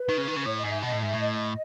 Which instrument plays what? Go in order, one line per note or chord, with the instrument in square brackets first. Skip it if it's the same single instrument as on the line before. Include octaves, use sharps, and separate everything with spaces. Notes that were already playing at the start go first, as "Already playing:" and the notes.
Already playing: [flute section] B4
[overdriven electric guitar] D#3
C#3
D#3
[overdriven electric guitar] C#3 [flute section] B4
[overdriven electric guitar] A2 [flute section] C#5
[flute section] D#5
[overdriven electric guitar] G#2
[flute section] E5
[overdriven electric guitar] B2 [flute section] D#5
[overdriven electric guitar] A2
[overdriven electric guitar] G#2 [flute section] E5
[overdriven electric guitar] A2
[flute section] D#5